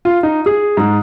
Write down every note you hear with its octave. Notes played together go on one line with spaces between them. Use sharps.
F4
D#4
G#4
G#2